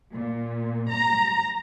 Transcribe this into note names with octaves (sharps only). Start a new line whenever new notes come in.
A#2
A#5